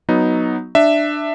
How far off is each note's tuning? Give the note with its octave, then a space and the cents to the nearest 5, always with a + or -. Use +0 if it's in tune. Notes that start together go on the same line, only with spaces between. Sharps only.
F#3 +0 B3 +0 D#4 +0
D4 +15 E5 +0